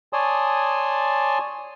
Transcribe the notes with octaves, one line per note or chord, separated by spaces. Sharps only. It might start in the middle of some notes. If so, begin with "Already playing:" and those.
C#5 D5 G#5 A5 C6 D#6